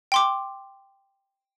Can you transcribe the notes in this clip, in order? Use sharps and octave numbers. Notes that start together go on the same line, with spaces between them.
G5 C6 D6